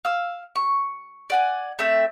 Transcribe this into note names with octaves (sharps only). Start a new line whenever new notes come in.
F5 E6
C#6
D5 F#5 G#5
A3 C4 E5